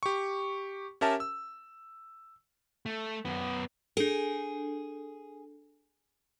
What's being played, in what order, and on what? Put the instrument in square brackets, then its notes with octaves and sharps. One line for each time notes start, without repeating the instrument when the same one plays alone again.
[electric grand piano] G4 C#6
C#4 G4 A#4 E5 A5
E6
[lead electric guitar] A3
F#2 B3
[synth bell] D4 A4 [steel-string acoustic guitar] G#4